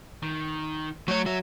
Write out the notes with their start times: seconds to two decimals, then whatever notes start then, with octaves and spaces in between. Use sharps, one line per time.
0.22 D#3
1.08 F#3 A3 C#5
1.26 F#3 E5